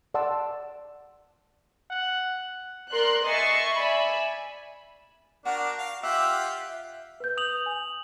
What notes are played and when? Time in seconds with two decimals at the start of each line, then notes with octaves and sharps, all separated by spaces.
0.14 D5 F#5 A5 C6 E6
1.90 F#5
2.90 A#4 D5 C6 F#6
3.26 D#5 E5 G#5 C#6 A6 C7
3.73 D5 E5 G#5 B5
5.45 D4 F#4 A#4 G5
5.78 F5
6.03 F4 G4 E5 F#5
7.20 B4 G6
7.37 D#6 F7 F#7
7.66 G#5